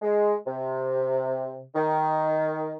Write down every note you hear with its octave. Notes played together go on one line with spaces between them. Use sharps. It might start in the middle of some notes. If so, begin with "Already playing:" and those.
G#3
C3
D#3